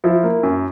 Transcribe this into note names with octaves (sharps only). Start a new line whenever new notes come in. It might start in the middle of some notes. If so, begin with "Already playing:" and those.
F3 E4
A#3
F#2